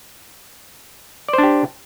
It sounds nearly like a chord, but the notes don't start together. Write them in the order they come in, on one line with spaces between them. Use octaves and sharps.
D5 C5 D4 G4